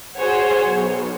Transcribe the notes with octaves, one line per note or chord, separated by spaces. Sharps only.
F#4 G#4 C5 C#5 F#5
B1